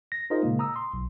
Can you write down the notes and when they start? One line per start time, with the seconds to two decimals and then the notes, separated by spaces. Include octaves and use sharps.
0.12 A#6
0.30 D#4 F4 G#4 A#4 C5 D#5
0.43 A#2 C#3 G#3 A#3
0.59 A#5 D#6 E6
0.76 C6
0.94 B1